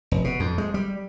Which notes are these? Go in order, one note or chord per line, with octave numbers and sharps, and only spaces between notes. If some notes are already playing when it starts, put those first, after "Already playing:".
F1
B2
F2
G#3
G3